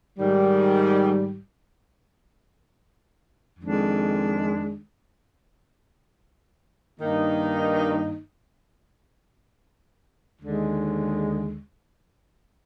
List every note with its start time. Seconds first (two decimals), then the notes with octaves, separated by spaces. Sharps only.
0.19 G#2 D#3 G3
3.60 F2 D#3 G#3 D4
7.00 G2 D#3 A#3 D#4
10.41 D#2 D3 G#3